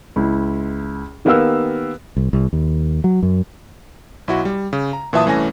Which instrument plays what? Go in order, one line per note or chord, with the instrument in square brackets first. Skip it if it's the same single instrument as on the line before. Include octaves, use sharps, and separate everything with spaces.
[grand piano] C#2 E4
D#3 A#3 B3 G4 F5 E6
[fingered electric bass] C2
C2
D#2
F#3
F#2
[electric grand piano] B1 E4 F#4
G3
C#3
A#5
A#2 E3 F#3 E5 A5 D#6
C2 E3 A3 C#4 G#5 A#6